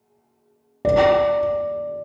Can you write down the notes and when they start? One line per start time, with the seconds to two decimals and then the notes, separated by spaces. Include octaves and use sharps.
0.85 D5